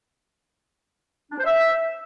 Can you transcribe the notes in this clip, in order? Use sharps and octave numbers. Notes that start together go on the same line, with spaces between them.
D4
C5
E5